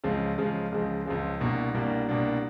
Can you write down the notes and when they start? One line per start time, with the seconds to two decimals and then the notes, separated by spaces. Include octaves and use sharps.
0.04 C#2 C#3 F3 G#3
0.38 C#2 C#3 F3 G#3
0.72 C#2 C#3 F3 G#3
1.06 C#2 C#3 F3 G#3
1.40 C2 B2 G3 A#3 D4
1.74 C2 B2 G3 A#3 D4
2.09 C2 B2 G3 A#3 D4